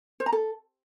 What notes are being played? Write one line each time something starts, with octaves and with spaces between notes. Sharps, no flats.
C5
A#5
A4